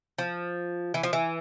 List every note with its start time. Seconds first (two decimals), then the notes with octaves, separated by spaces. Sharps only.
0.18 F3
0.94 E3
1.03 F3
1.13 E3